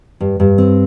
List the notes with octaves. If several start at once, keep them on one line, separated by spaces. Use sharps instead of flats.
G2
G2
C4